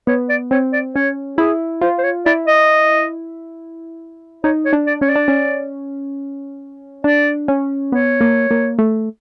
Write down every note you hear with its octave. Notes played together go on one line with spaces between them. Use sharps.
B3 C#5
D5
C4 C#5
D5
C#4 C#5
E4 G#4
F4 C5
C5
C#5
E4 D5
D#5
D#4 C#5
C#5
D4
D5
C#4 C#5
D5
D4
C#4
D4 D5
C#4
B3 C#5
A#3
A#3
A3